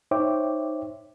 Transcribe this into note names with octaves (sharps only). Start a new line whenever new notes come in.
D#4 C5 C#5 E5 G5 D6